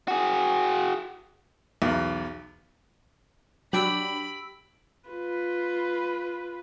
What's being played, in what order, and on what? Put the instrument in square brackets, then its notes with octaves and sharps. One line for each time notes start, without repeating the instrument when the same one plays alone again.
[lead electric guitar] F#4 G#4
[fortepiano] B1 E2
[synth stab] F#3 D4 F#4 [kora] G4 [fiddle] B5 [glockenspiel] E6 D7 F#7
[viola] F4 B4